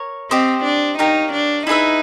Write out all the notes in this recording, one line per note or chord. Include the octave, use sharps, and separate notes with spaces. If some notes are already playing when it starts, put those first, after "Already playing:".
Already playing: A#4 C#5
C4 G4 C5 D#5
D4
D#4 G4 A#4 C#5 F5
D4
D#4 E4 G#4 B4 E5